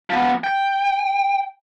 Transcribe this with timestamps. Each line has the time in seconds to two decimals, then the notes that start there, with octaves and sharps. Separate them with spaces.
0.10 F3 B3
0.44 G5